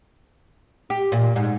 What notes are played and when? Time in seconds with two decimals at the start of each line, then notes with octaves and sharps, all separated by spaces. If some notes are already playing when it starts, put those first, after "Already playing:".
0.90 G4
1.12 A#2
1.36 G#2